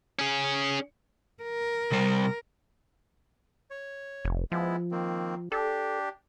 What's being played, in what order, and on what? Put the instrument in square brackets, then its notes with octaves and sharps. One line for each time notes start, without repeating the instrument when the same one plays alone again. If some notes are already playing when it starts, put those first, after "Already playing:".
[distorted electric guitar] C#4 G#4
[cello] A#4
[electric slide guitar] C3 G3 C5
[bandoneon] C#5
[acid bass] F1
[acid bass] F3 [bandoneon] G#3 B3 E4
[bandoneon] D#3 A#3 C4
[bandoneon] D4 G4 [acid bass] A4